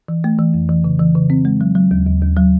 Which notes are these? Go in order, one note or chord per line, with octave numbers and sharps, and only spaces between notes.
E3
A3
E3
F2
E3
C#3
E3
C#3
C4
G#3
F#3
F#3
D#2
D#2
D#2
F#3